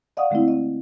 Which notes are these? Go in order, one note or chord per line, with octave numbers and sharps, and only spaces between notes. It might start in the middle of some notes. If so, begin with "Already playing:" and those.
D5 D#5 F5 F#5 C#6 D#6
D3 G#3 A3 C4 E4
D#5